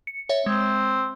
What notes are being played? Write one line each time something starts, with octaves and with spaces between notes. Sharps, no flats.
C#7
C#5 E5
G#3 C4